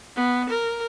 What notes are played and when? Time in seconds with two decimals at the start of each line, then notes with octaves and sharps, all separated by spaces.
0.16 B3
0.50 A#4